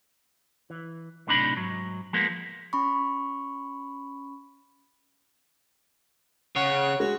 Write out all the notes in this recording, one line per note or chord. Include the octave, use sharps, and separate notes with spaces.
E3
B1 A2 C3 D4 D#4 B5
G#2 F#3
F3 G#3 A#3 B3
C#4 B5 C#6
C#3 C#5 F#5
G#3 F#4